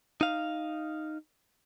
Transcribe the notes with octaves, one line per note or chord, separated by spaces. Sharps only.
D#4 F5